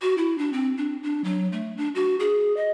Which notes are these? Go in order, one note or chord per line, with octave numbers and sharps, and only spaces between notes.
F#4
E4
D4
C4
D4
D4
F#3
A3
D4
F#4
G#4
D#5